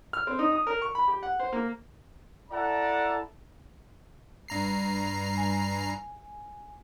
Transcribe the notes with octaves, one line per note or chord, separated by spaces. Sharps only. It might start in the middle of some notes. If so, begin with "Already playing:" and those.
F6
C4
D#4
D#6
A#4
C#6
B5
G4
F#5
C5
A#3
E4 A4 D5 F#5 A5 A#5
G2 A#5 C7
G#5